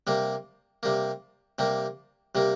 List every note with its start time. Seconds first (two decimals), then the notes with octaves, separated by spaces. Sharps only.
0.07 C3 G3 A#3
0.83 C3 G3 A#3
1.59 C3 G3 A#3
2.35 C3 G3 A#3